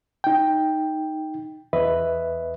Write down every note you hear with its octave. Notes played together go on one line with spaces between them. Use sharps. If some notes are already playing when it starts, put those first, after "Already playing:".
D#4 G5
E2 B4 D#5 E5